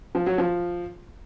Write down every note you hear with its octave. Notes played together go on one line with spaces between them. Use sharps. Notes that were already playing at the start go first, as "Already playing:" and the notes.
F3
F#3
F3